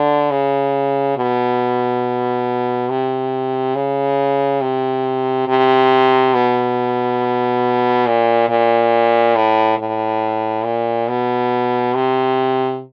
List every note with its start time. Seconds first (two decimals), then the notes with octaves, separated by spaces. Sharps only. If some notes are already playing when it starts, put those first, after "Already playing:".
Already playing: D3
0.31 C#3
1.17 B2
2.89 C3
3.75 C#3
4.61 C3
5.48 C3
6.34 B2
8.07 A#2
8.49 A#2
9.35 A2
9.78 A2
10.64 A#2
11.08 B2
11.94 C3